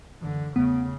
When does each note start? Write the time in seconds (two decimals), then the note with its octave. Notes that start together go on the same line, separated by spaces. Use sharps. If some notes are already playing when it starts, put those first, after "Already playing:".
0.22 F#1 D3 E3
0.56 E2 C#3 A3 B3